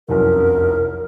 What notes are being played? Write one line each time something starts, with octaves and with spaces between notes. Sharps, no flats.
F1 C2 F#2 A#4